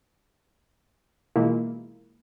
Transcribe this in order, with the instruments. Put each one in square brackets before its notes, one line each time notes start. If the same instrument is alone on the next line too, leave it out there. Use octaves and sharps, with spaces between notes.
[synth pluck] B2 E3 G#3 A#3 E4 F4